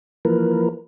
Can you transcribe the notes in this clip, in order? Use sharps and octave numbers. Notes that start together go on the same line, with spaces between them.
E3 F3 A#3 A#4 B4